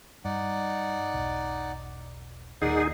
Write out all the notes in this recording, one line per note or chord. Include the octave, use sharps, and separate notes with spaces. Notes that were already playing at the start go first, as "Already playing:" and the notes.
G2 D#4 D5 F#5
E1 B1
D#2 A#2 D#4 G#4 A#4 D5 F#5